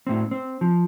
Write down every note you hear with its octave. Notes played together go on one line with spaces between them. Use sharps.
A2 C4
C4
F3